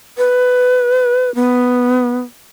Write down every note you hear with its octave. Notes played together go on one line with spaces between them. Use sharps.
B4
B3